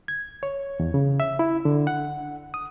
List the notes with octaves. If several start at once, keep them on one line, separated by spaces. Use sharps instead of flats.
G#6
C#5
E2
C#3
E5
E4
D3
F#5
D#6